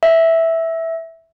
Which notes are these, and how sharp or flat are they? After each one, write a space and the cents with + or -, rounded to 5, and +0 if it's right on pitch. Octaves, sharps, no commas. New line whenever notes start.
E5 -5